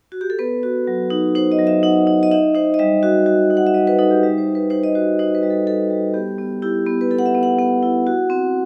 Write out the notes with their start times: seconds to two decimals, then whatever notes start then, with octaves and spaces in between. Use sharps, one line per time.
0.12 F#4
0.21 G4
0.30 A4
0.39 B3 B4
0.63 F#4
0.87 F#3
1.10 D#4
1.35 D#4 C5
1.52 D#5
1.58 F#3
1.67 E5
1.83 D#4 F#5
2.07 D#4
2.23 D#5
2.32 D#4 E5
2.55 D#4 C5
2.74 D#5
2.79 G3 E5
3.03 F#4
3.26 F#4
3.50 D#4
3.57 F#5
3.67 E5
3.74 G3 D#5
3.87 B4
3.99 D#4 A4
4.11 G4
4.23 G3 E5
4.38 C5
4.47 G3
4.55 B4
4.70 D#4 C5
4.83 D#5
4.95 F#4 C5
5.19 D#4 C5
5.35 B4
5.43 G3
5.50 A4
5.67 G3 A4
5.90 G3
6.14 B3 G4
6.38 B3
6.62 E4 G4
6.86 B3
7.01 B4
7.10 E4 A4
7.19 F#5
7.26 E5
7.35 B3
7.43 F#5
7.59 B3 F#5
7.83 E4
8.07 F#4
8.30 C4